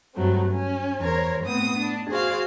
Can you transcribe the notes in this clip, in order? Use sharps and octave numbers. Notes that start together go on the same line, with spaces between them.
G2 F#3 A3 C4
C#4
E2 A#4 C5 C#5
A2 B3 C4 D#6
D4
F#4 G#4 C5 D5 F5